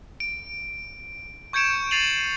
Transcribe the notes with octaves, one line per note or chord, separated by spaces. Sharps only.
D7
C#6 G6 G#6 C#7 D7 E7
A6 C7 D#7 F7 F#7